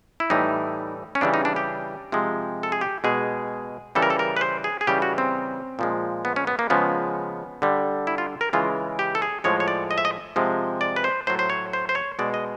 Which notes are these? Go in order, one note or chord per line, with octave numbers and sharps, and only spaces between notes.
E4
A2 E3 G3 D#4
C#4
C#3 E3 G3 D4
D#4
D4
G4
C3 F3 G#3
A4
G#4
G4
B2 G#3 G#4
C#3 E3 G3 A4
A#4
A4
A#4
B4
C5
G#4
G#4
C#3 E3 G3 G4
F#4
C4
A#2 F3 G#3
B3
C#4
B3
A#3
C#3 F3 G#3 B3
D3 G3
E4
F4
A#4
C#3 E3 G#3 F4
G4
A4
G#4
A2 F3 G#3 C#5
C#5
D5
D#5
E5
D#5
C3 F3 G#3
D5
B4
C5
A2 F#3 C5
C5
C#5
C5
C5
C#5
B2 G#3 D5
D#5